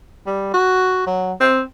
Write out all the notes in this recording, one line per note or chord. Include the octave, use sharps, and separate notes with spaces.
G3
F#4
F#3
C4